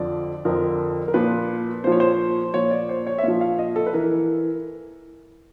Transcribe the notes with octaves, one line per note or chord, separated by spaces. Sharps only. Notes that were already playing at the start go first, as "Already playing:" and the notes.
Already playing: F2 D3 F3 D5
F2 D3 F3 A#4
A#4
A#2 F3 B4
A#2 F3 C5 C#5
C5
A#2 F3 C#5
D5
C5
C#5
E5
A#2 F3 F5
F5
D#5
A4
B4
E3 A#4